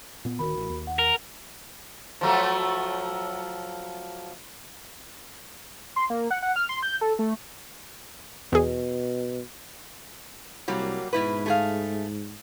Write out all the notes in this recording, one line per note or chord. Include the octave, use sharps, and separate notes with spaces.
A#2 B3
D1 B1 D#3 F#4 A#4 B5
A1
D#2
F#5
A#4
F3 F#3 A3
C6
A#3
F#5
F#5
F6
C6
G6
A4
A3
E2 B2 G#4
C2 F#3 G3 A#3
G#2 B2 E4 B4
A3 G#4 F5